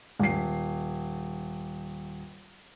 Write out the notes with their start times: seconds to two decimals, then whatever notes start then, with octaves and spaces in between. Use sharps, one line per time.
0.19 D#1 C7